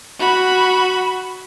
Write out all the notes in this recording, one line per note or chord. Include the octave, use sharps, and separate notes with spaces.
F#4 B5